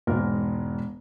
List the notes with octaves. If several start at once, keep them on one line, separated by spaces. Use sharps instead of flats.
E1 G#2 A#4